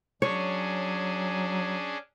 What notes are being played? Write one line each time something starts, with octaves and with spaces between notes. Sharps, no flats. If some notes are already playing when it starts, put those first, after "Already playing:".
F#3 C#4 D4 G#4 C#5